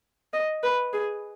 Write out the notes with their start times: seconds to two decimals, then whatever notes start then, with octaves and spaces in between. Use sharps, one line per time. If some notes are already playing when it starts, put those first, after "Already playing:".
0.34 D#5
0.63 B4
0.93 G#4